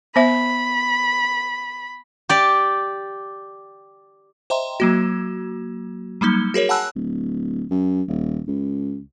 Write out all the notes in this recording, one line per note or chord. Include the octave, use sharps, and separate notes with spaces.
B3 C5 E5 B5
G4 D5
C5 D#5 E5 G5 A#5 C6
F#3 A#3 F#4
F#3 G3 A#3 D#4 G7
F#4 G#4 A#4 C#5
F#5 G#5 A5 B5 E6 F#6
D1
F#2
D#1
C#2